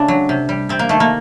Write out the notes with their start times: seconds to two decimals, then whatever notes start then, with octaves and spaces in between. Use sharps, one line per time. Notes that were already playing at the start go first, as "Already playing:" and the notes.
Already playing: C#3 A3 D4
0.08 F#3
0.29 C3
0.49 G3
0.69 C3 C4
0.79 A#3
0.89 D#3 A3
1.00 A#3